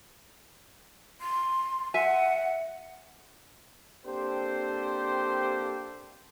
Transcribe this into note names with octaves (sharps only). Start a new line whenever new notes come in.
C6
E5 F#5 G#5
A#3 C4 D4 G4 A4 C5